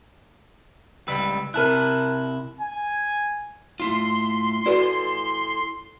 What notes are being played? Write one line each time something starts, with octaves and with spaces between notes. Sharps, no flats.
C#2 G3 B4 E6
C3 E4 A#4 A5 F#6
G#5
A3 E4 F4 C6
E4 F#4 A4 B4 D5 G#5